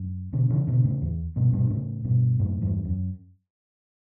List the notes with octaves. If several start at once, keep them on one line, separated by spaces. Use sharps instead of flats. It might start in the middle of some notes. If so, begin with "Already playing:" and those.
Already playing: F#2
B2 D3
C#3 E3
B2 D3
A2 C#3
E2
G2 B2
G2 B2
A2 C#3
G2 B2
F#2 A2
E2 G2
F#2